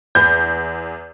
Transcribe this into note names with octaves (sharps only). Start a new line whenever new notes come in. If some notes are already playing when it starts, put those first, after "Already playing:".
E2 G6